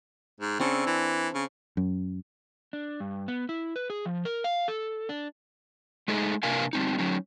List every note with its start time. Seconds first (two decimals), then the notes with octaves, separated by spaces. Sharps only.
0.40 G#2
0.60 C#3 C4 D4 A4
0.87 E3
1.34 C#3
1.77 F#2
2.73 D4
3.00 G2
3.28 B3
3.49 E4
3.76 B4
3.90 G#4
4.05 F3
4.25 A#4
4.44 F5
4.68 A4
5.09 D4
6.08 G#3 A3 D#4 G#4
6.43 C3 A#3 D4 A#4 F5 G#5
6.73 G3 C4 D#4
6.99 F#3 C#4 D#4